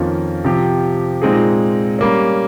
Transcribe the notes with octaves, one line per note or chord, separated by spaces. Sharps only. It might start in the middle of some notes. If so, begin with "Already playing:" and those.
Already playing: F2 D#3 A#3 C#4 F4
C3 F3 C4 G4
A#2 G#3 C4 D#4 G#4
G3 A#3 C#4